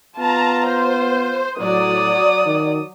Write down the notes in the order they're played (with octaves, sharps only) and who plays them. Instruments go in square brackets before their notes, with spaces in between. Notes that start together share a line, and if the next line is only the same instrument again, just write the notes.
[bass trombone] B3 [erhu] F4 [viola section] A5 A#5
[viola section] C5
[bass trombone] A2 [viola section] F#3 D5 [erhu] D#6
[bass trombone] D#3